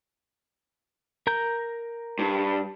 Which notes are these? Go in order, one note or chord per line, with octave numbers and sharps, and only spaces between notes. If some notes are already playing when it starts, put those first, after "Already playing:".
A#4 A#5 G6
G2